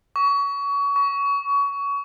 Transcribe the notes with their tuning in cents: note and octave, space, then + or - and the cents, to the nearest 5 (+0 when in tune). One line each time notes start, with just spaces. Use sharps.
C#6 +30
C#6 +25